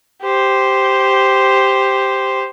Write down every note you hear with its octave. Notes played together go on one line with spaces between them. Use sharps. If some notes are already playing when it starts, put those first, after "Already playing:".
G4 C5